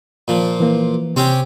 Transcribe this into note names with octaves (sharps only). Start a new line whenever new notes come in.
A#2 F3
E3 A#3
C3 C4 C#4 G4